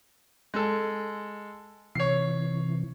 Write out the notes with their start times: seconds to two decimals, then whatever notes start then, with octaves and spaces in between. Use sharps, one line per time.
0.54 G#3 A4
1.95 C3 E3 C#5 C7